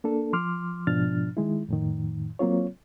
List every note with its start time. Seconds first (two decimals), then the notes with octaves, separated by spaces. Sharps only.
0.04 A#3 D4 A4
0.33 F3 C6 D6 F6
0.87 G#2 B2 F3 D4 F6 A6
1.37 D#3 G#3 E4
1.69 F2 A2 D#3
2.39 F#3 A#3 C4 F4 C#5